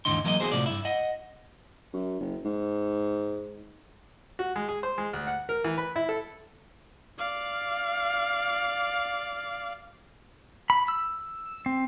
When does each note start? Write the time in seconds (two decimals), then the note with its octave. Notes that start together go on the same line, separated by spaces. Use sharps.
0.05 D#2 G#2 D3 E3 D#4 C6
0.24 E3 F#3 A#3 D5 D#5
0.40 B3 F#4 G#4 C5
0.52 A2 C3 F3 D5
0.66 G2 E4
0.85 D#5 F#5
1.93 F#2
2.20 F#1
2.45 G#2
4.39 F#4
4.56 G#3
4.69 G#4
4.83 C5
4.98 G#3
5.13 D2
5.27 F#5
5.49 A#4
5.64 E3
5.78 B4
5.96 E4
6.09 A4
7.19 D5 F5
10.70 B5
10.88 E6
11.66 C4